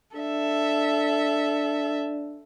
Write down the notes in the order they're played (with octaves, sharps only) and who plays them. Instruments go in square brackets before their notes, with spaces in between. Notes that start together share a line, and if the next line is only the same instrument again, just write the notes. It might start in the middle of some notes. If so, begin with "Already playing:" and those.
[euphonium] D4 [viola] A4 E5